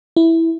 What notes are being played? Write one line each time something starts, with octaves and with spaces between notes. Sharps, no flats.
E4